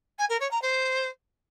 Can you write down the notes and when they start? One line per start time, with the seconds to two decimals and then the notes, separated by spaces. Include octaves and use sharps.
0.18 G#5
0.29 A#4
0.40 C#5
0.51 A#5
0.61 C5